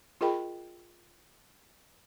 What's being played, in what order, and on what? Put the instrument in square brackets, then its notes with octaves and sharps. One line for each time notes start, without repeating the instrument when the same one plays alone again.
[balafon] F4 G#4 A#4 D#5 G5 B5